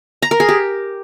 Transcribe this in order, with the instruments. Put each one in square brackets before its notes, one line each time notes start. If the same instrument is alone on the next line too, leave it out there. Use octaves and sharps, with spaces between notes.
[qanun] A#5
A#4
G#4
G4